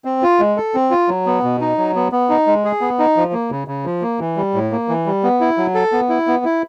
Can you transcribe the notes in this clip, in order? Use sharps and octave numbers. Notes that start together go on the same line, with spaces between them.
C4
F4
G#3
A4
C4
F4
F#3
B3
B2
D#4
F#3
B3
B3
D#4
G#3
G#4
B3
D#4
F3
A#3
C#3
C#3
F3
A#3
E3
G3
A2
A#3
E3
G3
B3
E4
F#3
A4
B3
E4
B3
E4